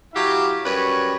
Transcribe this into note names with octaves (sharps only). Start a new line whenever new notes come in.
F#3 E4 G4 E5 F5
F#2 G3 B4 C#5